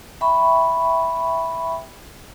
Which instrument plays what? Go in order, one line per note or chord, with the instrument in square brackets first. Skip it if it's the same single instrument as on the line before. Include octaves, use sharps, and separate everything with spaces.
[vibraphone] E5 G5 B5 C#6